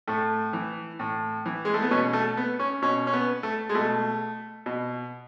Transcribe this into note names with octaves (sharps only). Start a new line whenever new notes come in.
A2 A3
E3
A2
E3
G#3
A3
B3
B2 C#4
A3
B3
C#4
B2 C#4
C#4
B3
A3
G#3
B2 A3
B2